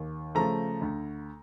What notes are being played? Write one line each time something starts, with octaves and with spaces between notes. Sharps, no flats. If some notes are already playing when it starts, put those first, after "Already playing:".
Already playing: D#2
C#3 F3 A3 A#5
D2